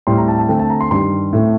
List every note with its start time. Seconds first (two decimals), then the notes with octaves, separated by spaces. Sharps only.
0.07 A2 G3 C4 C6
0.17 A#5
0.28 A5
0.38 A5
0.48 D3 A3 C4 G5
0.59 A5
0.70 A#5
0.81 C6
0.91 G2 D#3 G3 C6
1.33 A2 A3 C4